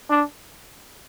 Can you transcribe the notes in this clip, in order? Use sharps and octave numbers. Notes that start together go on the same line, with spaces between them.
D4